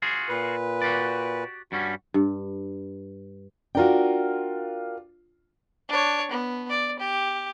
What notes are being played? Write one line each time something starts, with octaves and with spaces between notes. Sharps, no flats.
F4 F#4 G#4
A#2 B4
F#4 G4 D5
G2 G3 C#4 F#4
G2
D4 F4 F#4 A#4 G5
D4 C#5
B3
D5
G4